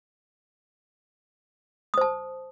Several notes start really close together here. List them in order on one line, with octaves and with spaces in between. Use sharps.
D#6 C5 A5